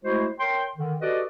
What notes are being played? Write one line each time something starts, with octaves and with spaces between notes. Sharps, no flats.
G#3 A3 E4 F#4 C5
A#4 C#5 G5 C6
D3 D#3
F#4 G4 A4 B4 D5 D#5